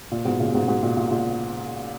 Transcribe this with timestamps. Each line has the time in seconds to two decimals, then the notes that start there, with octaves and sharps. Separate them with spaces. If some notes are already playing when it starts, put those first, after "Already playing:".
0.12 A#2
0.25 G#2 B2
0.39 A#2 C#3
0.53 G#2 B2
0.68 G#2 B2
0.83 A#2
0.97 A#2
1.11 A#2 C#3